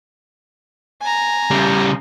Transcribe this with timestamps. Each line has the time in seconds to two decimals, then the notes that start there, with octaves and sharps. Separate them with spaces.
1.01 G#5 A#5
1.51 C#3 G3